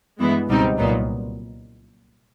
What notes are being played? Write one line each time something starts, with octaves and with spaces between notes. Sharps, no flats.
G2 E3 G#3 B3 E4
C#2 B2 G3 C4 D#4
C2 A#2 F#3 B3 D#4